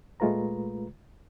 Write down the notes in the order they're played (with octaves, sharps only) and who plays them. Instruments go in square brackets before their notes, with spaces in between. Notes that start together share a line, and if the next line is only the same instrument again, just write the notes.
[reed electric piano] A#2 G#3 A3 F4 B4 A#5